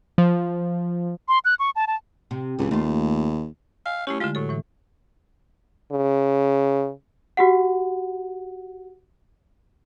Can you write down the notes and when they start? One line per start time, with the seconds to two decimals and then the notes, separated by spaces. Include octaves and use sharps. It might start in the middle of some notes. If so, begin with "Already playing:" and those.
0.18 F3
1.28 C6
1.45 F#6
1.59 C#6
1.76 A5
1.87 A5
2.31 C3
2.59 C#2 C#3 E3
2.71 D#2 A3 F4
3.86 F5 G#5
4.07 A3 C#4 E4 G4
4.20 D3 G#3 F4
4.35 A2 F#3 A4
4.49 A2 E3
5.92 C#3
7.37 F#4 G4 F#5